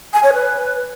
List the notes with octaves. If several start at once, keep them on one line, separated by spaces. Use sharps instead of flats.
G#5
C#5
B4